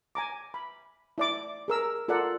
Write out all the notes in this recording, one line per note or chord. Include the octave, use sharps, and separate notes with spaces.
G#5 A#5 D6
B5
E4 D5 D6
G#4 A#4 E6
F4 A4 A#4 D5 F#5